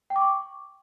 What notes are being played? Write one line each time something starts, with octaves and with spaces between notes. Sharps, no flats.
G5
D6
C#6